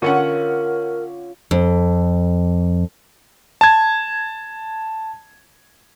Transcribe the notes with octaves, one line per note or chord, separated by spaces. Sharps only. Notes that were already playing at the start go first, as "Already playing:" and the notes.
D3 C#4 F4 A#4 C#5 F#5
F2
A5 G#6